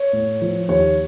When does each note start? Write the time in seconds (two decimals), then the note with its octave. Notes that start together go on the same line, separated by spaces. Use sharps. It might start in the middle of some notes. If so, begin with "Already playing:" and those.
Already playing: C#5
0.13 A2
0.42 F3
0.69 D#2 C#5